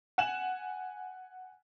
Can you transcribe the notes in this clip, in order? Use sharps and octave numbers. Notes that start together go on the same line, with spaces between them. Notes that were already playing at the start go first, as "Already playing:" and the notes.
F#5 G#5 E7 F#7